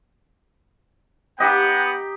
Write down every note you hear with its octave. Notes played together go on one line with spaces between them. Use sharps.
B3 D#4 G4 D#5 F#5 G5